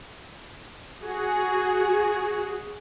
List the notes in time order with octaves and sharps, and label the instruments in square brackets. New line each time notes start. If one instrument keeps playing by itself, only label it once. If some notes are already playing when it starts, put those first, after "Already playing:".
[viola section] F#4 G#4